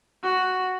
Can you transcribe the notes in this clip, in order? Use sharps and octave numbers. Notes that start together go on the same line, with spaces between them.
F#4